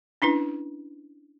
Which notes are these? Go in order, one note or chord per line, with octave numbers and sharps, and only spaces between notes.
C#4 D4 E4 B4